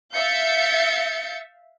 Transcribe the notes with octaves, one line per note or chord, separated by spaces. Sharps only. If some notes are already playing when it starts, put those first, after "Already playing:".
E5 F5 G6 A6 C#7